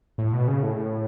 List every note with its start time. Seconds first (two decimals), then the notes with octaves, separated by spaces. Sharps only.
0.18 A2
0.33 B2
0.48 C#3
0.63 A2